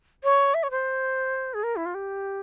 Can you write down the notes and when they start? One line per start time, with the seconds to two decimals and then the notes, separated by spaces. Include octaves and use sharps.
0.24 C#5
0.54 E5
0.63 C#5
0.71 C5
1.54 G#4
1.63 A#4
1.76 E4
1.86 F4
1.95 G4